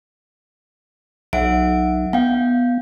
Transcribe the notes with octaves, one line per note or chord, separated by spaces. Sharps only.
B1 E5 F#5 D7
B3 F5 G5